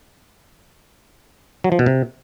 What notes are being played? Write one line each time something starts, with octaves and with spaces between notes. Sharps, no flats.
F#3
F3
B2
C3